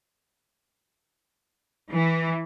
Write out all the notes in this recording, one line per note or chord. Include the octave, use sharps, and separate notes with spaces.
E3